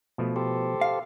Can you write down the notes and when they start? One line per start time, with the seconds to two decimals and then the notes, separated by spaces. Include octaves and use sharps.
0.18 B2 F3 A3
0.36 G4 A4 C5
0.81 F5